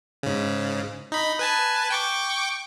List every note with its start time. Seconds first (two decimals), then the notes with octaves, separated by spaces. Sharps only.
0.23 G#2 C#3
1.12 D#4 B5
1.39 B4 G#5 A5
1.90 G5 C#6 D6